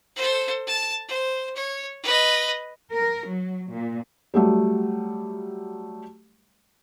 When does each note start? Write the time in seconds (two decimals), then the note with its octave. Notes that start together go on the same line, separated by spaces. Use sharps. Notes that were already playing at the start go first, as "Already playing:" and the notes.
0.16 A4 C5
0.67 A5
1.08 C5
1.56 C#5
2.03 B4 D#5
2.93 A#4
3.30 F#3
3.72 A#2
4.34 F#3 G3 A3